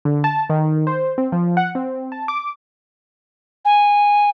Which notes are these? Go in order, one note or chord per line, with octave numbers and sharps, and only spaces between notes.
D3
A5
D#3
C5
C4
F3
F#5
C4
A5
D6
G#5